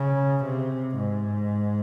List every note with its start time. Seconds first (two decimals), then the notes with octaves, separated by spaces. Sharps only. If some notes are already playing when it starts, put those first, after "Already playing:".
Already playing: C#3
0.45 C3
0.97 G#2